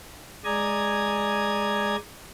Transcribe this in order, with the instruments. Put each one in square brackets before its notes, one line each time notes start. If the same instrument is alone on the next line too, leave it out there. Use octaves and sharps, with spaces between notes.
[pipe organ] G#3 D5 G#5 A#5 D#6 G#6